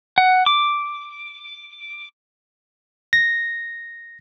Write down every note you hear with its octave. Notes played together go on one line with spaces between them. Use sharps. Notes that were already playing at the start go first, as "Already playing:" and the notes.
F#5
D6
A#6